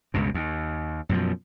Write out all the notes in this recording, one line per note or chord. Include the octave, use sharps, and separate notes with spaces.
C#2 G2 B2
D#2
F#2 B2 F3